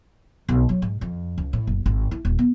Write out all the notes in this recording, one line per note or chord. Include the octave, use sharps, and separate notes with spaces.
B1
F#3
G#2
F2
C#2
A2
F#1
G#1
E4
D#1
B3